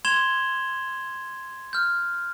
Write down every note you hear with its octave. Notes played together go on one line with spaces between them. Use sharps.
C6 G#6 E7 F7 G7
F6 G6